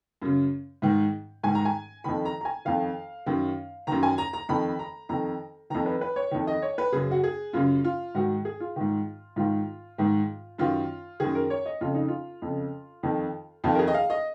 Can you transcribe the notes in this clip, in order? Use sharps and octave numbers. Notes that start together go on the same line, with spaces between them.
F#2 C#3
G#2 D#3
G#2 D#3 G#5
A#5
G#5
F2 D#3 B5
A#5
A#5
G#5
F2 D#3 F5
F#2 D#3
F#2 D#3 A#5
G#5
A#5
A#5
F2 D#3 B5
A#5
F2 D#3 A#5
F2 D#3 A#5
B4
B4
C#5
F2 D#3
D#5
C#5
B4
F#2 C#3 G#4
F#4
G#4
F#2 C#3 F4
F4
G#2 D#3 F#4
G#4
F4
G#2 D#3
G#2 D#3 F4
G#2 D#3
F#2 D#3 F4
F#2 D#3 G#4
A#4
C#5
D#5
F2 C#3 F4
D#4
F4
F2 C#3
F2 D#3
F2 D#3 F4
A#4
G#4
D#5
F5
D#5